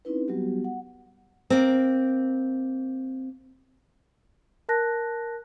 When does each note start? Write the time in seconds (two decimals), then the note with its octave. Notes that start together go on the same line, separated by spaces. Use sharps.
0.05 C4 C#4 D#4 E4 B4
0.28 F#3 G3 B3 F#4 G4
0.64 F#5
1.50 A#3 C4
4.69 A#4 A5 F#6 A#6